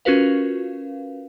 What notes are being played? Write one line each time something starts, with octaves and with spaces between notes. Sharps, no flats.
C#4 F4 F#4 A#4 B4 F5